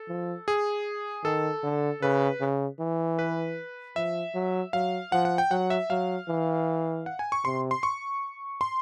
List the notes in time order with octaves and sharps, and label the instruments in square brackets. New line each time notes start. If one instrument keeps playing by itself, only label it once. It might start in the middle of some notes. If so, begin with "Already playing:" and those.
Already playing: [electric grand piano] A4
[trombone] F3
[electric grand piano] G#4
[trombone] D#3 [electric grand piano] A4
[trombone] D3
[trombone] C#3 [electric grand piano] B4
[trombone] C#3
E3
[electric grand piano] B4
[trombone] F3 [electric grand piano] E5
[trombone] F#3
[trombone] F#3 [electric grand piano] F5
[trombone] F3 [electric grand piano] F#5
[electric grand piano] F#5
G5
[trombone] F#3 [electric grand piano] F#5
[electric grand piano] E5
[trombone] F#3 [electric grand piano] F5
[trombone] E3
[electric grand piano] F#5
G#5
C#6
[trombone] C3 [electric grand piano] C6
[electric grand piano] C6
C#6
C6